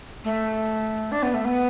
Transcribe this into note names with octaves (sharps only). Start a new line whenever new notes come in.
A3
D4
B3
A3
B3